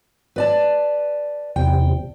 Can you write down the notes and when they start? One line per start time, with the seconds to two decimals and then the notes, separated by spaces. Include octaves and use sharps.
0.36 B4 D5 A5
1.56 E2 C3 G5